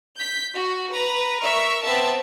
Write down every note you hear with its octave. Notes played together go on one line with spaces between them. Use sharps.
G6 B6
F#4
B4 A#5
A#4 E5 C#6
B3 C4 E5 A5